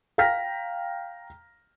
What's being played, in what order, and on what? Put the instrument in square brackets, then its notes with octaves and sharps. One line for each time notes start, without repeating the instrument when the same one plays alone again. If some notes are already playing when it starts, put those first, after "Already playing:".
[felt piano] F5 G5 A#5 F6 A#6 B6